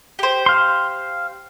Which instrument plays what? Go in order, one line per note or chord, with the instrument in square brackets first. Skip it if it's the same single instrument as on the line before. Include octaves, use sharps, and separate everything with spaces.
[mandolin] G4 C5
[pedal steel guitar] F5 C6